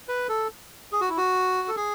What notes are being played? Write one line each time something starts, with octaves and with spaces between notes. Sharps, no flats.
B4
A4
G#4
F#4
E4
F#4
A4
G#4